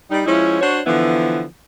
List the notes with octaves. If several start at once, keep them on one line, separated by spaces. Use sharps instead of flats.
G3 D#4
F3 G#3 C#4 E4
D4 F#4 C5 C#5
D3 E3 F3 B3 E4